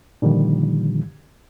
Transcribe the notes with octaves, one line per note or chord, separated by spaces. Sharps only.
A#2 D3 D#3 F3 G3